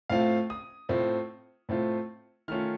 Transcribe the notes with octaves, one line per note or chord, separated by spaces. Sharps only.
A2 A3 C4 F4 F5
D#6
A2 A3 C4 F4
A2 A3 C4 F4
D#3 A3 C#4 F4 F6